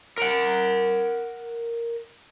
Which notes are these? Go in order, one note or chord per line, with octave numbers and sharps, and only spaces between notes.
A#4 F#5